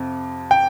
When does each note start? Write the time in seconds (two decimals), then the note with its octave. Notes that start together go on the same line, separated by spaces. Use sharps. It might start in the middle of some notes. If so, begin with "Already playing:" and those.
Already playing: F2 C3
0.51 G5